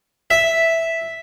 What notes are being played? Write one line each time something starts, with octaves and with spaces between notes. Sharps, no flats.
E5